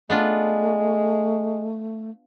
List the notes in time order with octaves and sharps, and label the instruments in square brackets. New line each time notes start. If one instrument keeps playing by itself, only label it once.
[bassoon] G#3 [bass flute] A3 [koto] B3 D4 F4